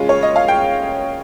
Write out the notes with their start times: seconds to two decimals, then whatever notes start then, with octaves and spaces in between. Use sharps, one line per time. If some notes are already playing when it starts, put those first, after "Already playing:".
Already playing: C#3 G#3 C#4 F4
0.09 C#5
0.23 D#5
0.36 F5
0.48 G5